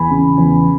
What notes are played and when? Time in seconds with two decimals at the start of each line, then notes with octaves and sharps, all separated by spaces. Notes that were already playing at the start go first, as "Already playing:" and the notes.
Already playing: E2 G#5 B5
0.11 C#3
0.38 E2